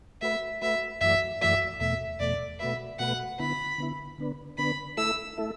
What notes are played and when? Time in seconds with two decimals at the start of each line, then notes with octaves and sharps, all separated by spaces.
0.21 A3 F#4 B4 E5
0.61 A3 F#4 B4 E5
1.01 F#2 E3 A3 F#4 D5 E5
1.41 F#2 E3 A3 F#4 D5 E5
1.80 E2 B2 A3 E5
2.20 E2 B2 A3 D5
2.59 B2 A3 F#4 B4 E5
2.99 B2 A3 F#4 B4 F#5
3.39 D3 B3 E4 B5
3.78 D3 B3 E4
4.18 D3 B3 D4 B4
4.58 D3 B3 D4 B4 B5
4.97 A3 E4 A4 E5 E6
5.37 A3 E4 A4 E5